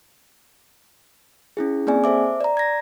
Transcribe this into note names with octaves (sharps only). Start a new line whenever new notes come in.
C#4 E4 G#4
A#3 C4 G#4 D5 G#5
A4 C5 E5 D6
D5 A#5
G#6 A#6